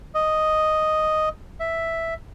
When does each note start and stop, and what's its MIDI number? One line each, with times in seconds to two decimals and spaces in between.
0.15 1.29 75
1.60 2.14 76